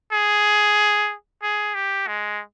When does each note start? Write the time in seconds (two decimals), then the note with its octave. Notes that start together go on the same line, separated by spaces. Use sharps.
0.12 G#4
1.42 G#4
1.75 G4
2.07 G#3